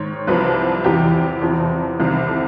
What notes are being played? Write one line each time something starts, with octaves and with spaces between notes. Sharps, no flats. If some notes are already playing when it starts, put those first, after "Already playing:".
Already playing: G#2 D#3 C#5
C2 C3 F3 B4
E2 C3 E3 G4
E2 C3 F3
C2 C3 D#3
A4